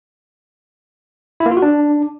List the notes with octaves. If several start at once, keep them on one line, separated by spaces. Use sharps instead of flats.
E4
A#3
F4
F#4
D4